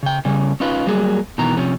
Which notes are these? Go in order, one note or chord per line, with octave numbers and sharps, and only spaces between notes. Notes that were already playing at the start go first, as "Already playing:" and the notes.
C#3 G5
C#3 G3 C#4
C#4 D#4 F4 B4
F#3 G3 A#3 G#4
B2 D#3 E3 A#5
C3 F3 C#4